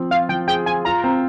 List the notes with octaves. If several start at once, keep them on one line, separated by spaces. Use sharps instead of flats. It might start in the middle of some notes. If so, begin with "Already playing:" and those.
Already playing: F3 C4
F4 F5
F3 G5
G#4 G5
F4 G#5
F4 A#5
C4